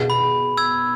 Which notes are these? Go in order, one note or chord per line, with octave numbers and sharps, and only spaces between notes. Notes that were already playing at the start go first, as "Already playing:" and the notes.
Already playing: B2 B3 G#4
B5
E6 G#6